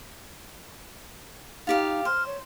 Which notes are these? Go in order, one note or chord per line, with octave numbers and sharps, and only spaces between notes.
D#4 F4 G4 F5
C5 F6
C#5